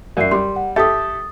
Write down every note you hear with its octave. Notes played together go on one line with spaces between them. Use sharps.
F#2 D5 E5 C7
G3 C6
F#5
G4 A4 E5 D#6 A6